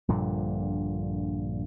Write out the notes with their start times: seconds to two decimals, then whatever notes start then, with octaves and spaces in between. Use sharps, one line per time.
0.08 A#1 G2 A#2 D3